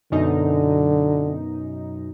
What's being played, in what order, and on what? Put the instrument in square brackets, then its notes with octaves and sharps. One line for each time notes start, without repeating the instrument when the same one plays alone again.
[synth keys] F#2 B2 D#4 [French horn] D3